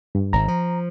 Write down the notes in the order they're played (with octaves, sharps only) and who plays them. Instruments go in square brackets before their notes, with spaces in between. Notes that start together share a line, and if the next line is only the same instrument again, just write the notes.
[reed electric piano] G2
[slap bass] G#1 [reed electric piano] A#5
[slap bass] F3